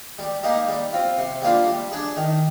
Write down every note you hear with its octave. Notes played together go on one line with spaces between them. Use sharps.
G3
A#3 D#4 G4
G3
C4 F4
C3
G3 A#3 D4 F4
G3
D4 G#4
D#3